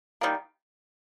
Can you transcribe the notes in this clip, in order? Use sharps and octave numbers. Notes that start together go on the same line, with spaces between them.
D#3 G3 A#3